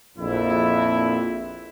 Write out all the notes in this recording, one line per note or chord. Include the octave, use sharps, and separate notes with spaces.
A#1 F2 E4